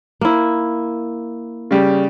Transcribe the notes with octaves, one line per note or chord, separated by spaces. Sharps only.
A#3 E4
C#3 G3